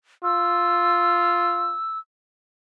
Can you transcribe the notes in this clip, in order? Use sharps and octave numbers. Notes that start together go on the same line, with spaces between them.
F4 E6